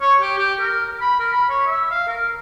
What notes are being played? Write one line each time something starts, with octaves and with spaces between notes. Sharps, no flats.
C#5
G4
G4
A#4
B5
A#4
B5
C#5
E5
F5
A#4